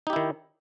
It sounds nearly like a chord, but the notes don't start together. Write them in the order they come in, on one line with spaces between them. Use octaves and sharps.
D#4 G4 E4 D#3